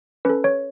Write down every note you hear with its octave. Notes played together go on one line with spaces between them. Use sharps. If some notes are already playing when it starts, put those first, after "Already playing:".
C#4 A4 B4
C#5